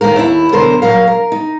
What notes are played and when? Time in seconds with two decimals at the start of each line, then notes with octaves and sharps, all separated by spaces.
0.01 D2 D#3 A3 A#3 A#4
0.16 D#2 E4
0.52 F#2 B2 D3 A#4 C5
0.82 A#2 F#3 A#4 F5
1.07 A#4
1.32 D#4